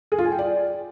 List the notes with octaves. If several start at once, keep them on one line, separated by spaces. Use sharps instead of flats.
G#4
F4
G#5
G5
D5